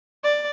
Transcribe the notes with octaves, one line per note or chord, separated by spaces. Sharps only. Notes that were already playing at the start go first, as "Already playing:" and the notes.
D5